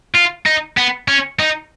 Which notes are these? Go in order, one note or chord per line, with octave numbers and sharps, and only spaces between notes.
F4
D#4
B3
C#4
D#4